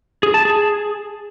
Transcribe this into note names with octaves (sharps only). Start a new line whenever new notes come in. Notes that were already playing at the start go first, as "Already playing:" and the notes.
G#4
A5
G#4